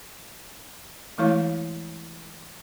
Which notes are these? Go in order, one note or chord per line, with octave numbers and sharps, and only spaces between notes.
E3 G#3 A3 E4 C#5 F5